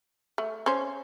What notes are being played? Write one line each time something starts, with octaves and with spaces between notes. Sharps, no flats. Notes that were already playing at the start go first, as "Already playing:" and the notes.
A3
C#4 C5